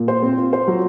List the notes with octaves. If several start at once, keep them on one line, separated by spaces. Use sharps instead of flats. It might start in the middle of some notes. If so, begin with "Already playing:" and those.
Already playing: A#2
C5
C4
F4
C5
F#3